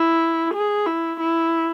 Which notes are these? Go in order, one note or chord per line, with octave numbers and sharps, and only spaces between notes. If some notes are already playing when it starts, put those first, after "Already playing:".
Already playing: E4
G#4
E4
E4